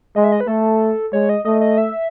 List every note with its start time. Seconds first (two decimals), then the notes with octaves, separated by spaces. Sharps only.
0.16 G#3 D#5
0.24 E5
0.32 D#5
0.40 B4
0.48 A3 A4
1.13 G#3 C#5
1.29 D#5
1.45 A3 D#5
1.61 D#5
1.78 E5